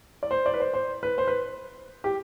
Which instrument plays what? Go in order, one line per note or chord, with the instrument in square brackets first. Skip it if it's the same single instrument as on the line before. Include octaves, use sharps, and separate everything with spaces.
[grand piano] D5
C5
D5
B4
C5
C5
B4
C5
B4
G4